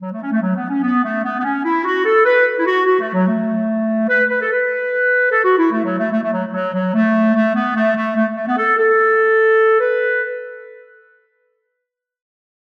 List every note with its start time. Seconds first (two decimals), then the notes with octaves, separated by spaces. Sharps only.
0.02 F#3
0.12 A3
0.22 C#4
0.32 A3
0.42 F#3
0.56 B3
0.70 C#4
0.83 B3
1.04 A3
1.24 B3
1.40 B3
1.44 C#4
1.65 E4
1.85 F#4
2.05 A4
2.26 B4
2.59 E4
2.67 F#4
2.87 F#4
3.00 A3
3.14 F#3
3.28 A3
4.09 B4
4.30 B4
4.42 A4
4.53 B4
5.32 A4
5.44 F#4
5.58 E4
5.72 A3
5.85 F#3
5.99 A3
6.12 A3
6.24 A3
6.33 F#3
6.53 F#3
6.74 F#3
6.95 A3
7.35 A3
7.55 B3
7.76 A3
7.96 A3
8.16 A3
8.36 A3
8.48 B3
8.58 A4
8.78 A4
9.80 B4